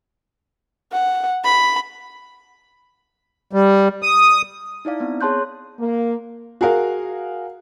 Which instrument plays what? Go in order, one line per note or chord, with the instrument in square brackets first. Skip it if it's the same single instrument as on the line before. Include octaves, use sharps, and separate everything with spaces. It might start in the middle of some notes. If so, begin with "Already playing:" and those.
[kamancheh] F#5
B5
[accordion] G3
D#6
[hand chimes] D#4 E4 D5 F5
B3 C4
G#4 C#5 A5 C6 F#6 G6
[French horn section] A#3
[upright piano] F#4 G#4 A#4 F5